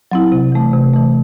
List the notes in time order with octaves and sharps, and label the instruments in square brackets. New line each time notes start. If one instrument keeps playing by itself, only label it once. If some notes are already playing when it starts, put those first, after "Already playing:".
[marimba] F#3 C4 E4
C3
E3 A3
C3
E3 A3